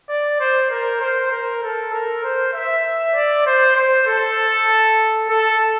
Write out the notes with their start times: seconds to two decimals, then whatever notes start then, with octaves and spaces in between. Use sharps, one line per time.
0.09 D5
0.40 C5
0.70 A#4
1.01 C5
1.31 A#4
1.63 A4
1.93 A#4
2.23 C5
2.53 E5
3.15 D5
3.46 C5
3.76 C5
4.07 A4
5.29 A4